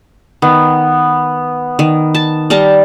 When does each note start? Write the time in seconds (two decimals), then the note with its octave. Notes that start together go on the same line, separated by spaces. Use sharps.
0.42 D#3 B3
1.79 D#3
2.15 A5
2.50 G3 A#4 A5